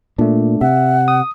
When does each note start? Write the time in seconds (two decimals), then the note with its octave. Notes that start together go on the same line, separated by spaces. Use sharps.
0.19 A#2 A3 D4
0.61 C3 E5 F#5
1.08 D#6